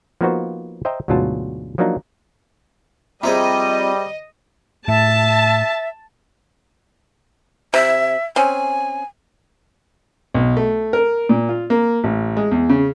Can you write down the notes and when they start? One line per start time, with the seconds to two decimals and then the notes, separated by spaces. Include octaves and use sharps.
0.21 F3 A#3 B3 D#4 F#4 C5
0.85 C5 D#5 E5 G5 A#5
1.08 D2 G#2 B2 F#3 F4 A5
1.78 F3 F#3 A#3 D4 D#4
3.23 G3 C4 F4 G#4 C5 D#5 E5 A#5
4.88 A2 E5 A5
7.74 C3 E5
8.36 C4 C#4 G#5
10.34 B1
10.57 A3
10.93 A#4
11.29 A#2
11.49 F4
11.70 A#3
12.04 A1
12.37 G#3
12.51 E2
12.69 C#3